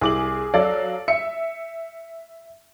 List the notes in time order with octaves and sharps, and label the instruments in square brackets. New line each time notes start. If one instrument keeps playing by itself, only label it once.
[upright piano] C2 F#7 [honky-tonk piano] G#4 D6
[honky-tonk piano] F#3 F5 [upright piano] A4 D5
[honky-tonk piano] E5 [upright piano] C#7